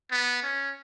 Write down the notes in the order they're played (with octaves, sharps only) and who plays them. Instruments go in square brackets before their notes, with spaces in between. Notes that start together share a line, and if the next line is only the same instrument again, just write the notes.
[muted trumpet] B3
C#4